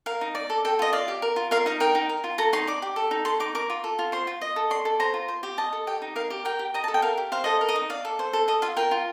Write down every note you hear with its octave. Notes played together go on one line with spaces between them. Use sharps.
A#4 F5
D#4
D5
A4
A4 G5
F4 D#5
D5 F5
G4
A#4
F4
A#4 F5
D#4 F5
A#4 G5
D#4
A#4
F4
A4 A#5
D#4 C6
D5 D6
G4
A4
D#4
A4 C6
D#4 D6
A#4 D6
F4
A4
F4
C5 C6
F4
D#5
A4
D5 C6
A4
C5 A#5
F4
C5
G4
D#5 A5
A4
G4 G5
D#4
A#4 F5
G4
A#4 G5
G4
D#5 A#5
A5
A4
G5
A#4 F5
G4
C5 F5
A4 D#5
A#4
D#5
D#4
D5 F5
A4
C5
A4
A4 D#5
F4 F5
A#4 G5
F4